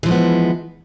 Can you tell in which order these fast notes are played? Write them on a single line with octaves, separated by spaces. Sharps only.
E3 F3 G#3 B3